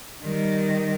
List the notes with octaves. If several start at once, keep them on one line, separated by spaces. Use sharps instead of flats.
D#3 G3